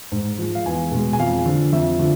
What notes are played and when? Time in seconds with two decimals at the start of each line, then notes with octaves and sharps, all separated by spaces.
0.12 G#2
0.38 F3 G#3
0.55 F5
0.66 E2 G#5
0.92 B2 G#3
1.13 G#5
1.19 F2 F5
1.46 D3 F3
1.72 F2 E5
1.99 D3 F3